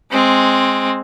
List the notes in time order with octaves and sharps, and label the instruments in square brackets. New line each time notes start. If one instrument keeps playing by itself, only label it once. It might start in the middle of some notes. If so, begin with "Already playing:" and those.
[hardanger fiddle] G#3 C4